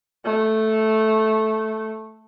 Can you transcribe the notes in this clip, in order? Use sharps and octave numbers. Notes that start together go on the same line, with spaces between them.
A3